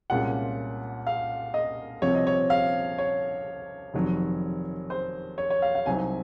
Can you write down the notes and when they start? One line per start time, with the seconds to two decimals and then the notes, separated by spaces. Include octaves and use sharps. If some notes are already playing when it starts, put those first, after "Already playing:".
0.10 C2 A#2 G#3 C#4 F4 F#5
1.07 F5
1.54 D#5
2.02 C2 C3 F3 C4 C#5
2.15 D#5
2.27 C#5
2.50 F5
2.98 C#5
3.94 F1 F2 D#3 F#3
4.90 C5
5.38 C#5
5.50 C#5
5.62 F5
5.75 F5
5.86 C2 C3 F#3 C4 D#4 G#5